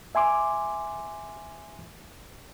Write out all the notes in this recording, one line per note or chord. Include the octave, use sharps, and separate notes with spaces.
E5 G#5 C6 D6